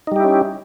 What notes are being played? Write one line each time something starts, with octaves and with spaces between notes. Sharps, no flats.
G3 C#4 D#4 E4 G4